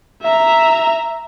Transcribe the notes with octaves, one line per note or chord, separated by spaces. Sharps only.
E5 A#5